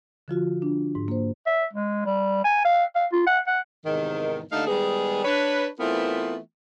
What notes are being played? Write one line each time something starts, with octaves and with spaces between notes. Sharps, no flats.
D3 F3 F4 F#4
D4
G#2
A#3 C5
E5
G#3
G3
G#5
F5
F5
F4
F#5
F#5
E2 G#2 C3 D#3
D#2 D3 A3 D#4 F5
D#3 G3 G#3 B3 G#4
D4 B4 C#5
E3 A3 B3 C4 F4 A#4